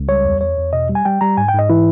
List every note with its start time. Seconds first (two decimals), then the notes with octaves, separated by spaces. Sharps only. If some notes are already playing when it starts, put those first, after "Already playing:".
Already playing: C#2
0.08 G3 C#5
0.25 E2
0.41 E2 C#5
0.57 E2
0.73 B2 D#5
0.89 G3
0.95 G#5
1.05 G3 G5
1.21 G3 A#5
1.37 G#2 G#5
1.48 G5
1.53 G#2
1.59 D#5
1.70 E3 E4